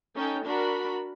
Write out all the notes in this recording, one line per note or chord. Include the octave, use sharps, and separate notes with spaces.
C#4 D#4 A4 G5
D4 F#4 A#4 B5